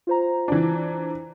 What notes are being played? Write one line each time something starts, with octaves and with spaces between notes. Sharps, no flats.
F4 C5 A#5
E3 D4